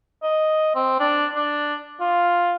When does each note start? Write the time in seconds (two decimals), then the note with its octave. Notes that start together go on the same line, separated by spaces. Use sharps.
0.23 D#5
0.75 C4
1.00 D4
1.35 D4
2.00 F4